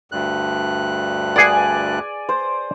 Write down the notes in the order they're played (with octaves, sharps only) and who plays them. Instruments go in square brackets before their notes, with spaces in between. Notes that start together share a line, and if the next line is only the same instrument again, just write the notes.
[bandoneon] D2 G2 F#6
[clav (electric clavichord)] G#4 F#5 [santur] D5 G#5
[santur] C5